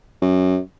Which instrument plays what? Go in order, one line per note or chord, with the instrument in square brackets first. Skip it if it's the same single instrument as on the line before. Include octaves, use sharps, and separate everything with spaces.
[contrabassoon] F#2